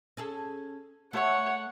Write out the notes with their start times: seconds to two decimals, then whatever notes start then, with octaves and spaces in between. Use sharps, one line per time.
0.17 C#4 G#4 A4
1.13 A3 C#5 E5 F#5